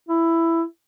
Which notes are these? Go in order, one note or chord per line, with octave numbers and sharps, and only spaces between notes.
E4